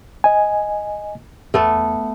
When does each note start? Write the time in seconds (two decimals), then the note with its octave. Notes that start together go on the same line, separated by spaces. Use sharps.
0.24 D#5 G#5
1.54 E2 A3 B3 A4